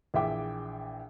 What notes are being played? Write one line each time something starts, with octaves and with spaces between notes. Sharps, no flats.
A#1 E3 G#4 E5 G5 D6